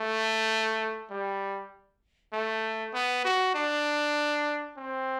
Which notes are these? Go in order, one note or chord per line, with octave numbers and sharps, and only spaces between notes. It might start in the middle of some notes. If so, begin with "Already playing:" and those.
Already playing: A3
G3
A3
B3
F#4
D4
C4